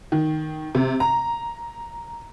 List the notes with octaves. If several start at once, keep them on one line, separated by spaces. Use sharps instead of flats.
D#3
C3
A#5